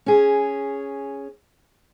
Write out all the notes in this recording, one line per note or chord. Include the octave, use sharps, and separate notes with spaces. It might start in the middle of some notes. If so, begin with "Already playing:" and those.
C#4 G#4